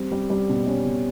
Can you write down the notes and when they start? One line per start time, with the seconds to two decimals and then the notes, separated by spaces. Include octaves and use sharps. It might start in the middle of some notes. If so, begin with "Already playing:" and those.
Already playing: G3 C4
0.12 G3
0.30 G3
0.49 B2
0.66 G3 C#4
0.85 B2